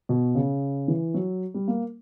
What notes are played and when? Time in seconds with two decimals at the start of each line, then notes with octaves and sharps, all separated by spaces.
0.09 B2
0.35 C#3
0.88 E3
1.14 F#3
1.54 G3
1.68 A#3